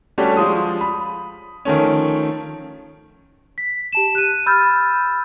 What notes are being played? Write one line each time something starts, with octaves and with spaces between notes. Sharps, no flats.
G3 A3 C#4 D4 F#4 G4
F3 G#3 F4 D#6
B5
D#3 F3 A3 C#4
B6
G4 A5 E7
F#6 D#7
B5 E6 F6 G6 A6